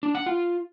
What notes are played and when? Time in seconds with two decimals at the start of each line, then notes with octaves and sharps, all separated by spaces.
0.03 D4
0.15 F#5
0.26 F4